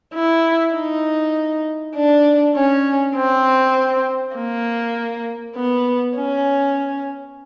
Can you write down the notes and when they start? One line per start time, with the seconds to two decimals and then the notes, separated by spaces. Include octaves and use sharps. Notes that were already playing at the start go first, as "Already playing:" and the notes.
0.14 E4
0.75 D#4
1.95 D4
2.55 C#4
3.15 C4
4.36 A#3
5.56 B3
6.16 C#4